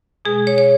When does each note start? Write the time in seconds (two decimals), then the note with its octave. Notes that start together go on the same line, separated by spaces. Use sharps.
0.25 B2 G#3 G#4
0.47 C#5
0.58 C#5